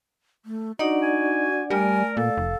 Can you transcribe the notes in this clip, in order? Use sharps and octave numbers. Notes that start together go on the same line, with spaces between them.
A3
D4 D#4 F#4 D5 F#5
G#5
G3 A3 A#4 D5 G#5
A#2 A4 F5
F1